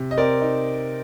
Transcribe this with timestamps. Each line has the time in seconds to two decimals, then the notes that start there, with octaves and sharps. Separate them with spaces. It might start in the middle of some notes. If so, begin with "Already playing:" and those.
Already playing: C3
0.11 D#5
0.17 C4 A#4 D5
0.41 D#4